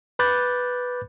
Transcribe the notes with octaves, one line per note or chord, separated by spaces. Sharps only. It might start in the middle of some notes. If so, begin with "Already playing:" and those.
B4 B5 D6 F#6 G6 A6